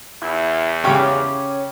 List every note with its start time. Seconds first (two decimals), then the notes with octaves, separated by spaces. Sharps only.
0.22 E2 E4
0.84 C#3 C#4 G4 C#5 F5 D6